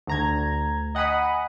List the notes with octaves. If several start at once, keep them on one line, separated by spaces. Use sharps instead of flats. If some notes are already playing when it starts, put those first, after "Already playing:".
D2 A#5 G#6
D#5 F#5 G#5 B5 D#6